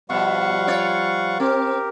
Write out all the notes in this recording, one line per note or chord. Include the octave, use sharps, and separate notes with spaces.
B2 F3 G3 F5 F#5 C#6
F4 C#5 D5
C4 G4 A#4